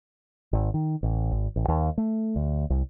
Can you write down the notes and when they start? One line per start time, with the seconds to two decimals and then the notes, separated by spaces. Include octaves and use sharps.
0.53 G#1
0.74 D#3
1.03 A1
1.31 G#1
1.56 A1
1.68 D#2
1.98 A3
2.36 D2
2.70 C2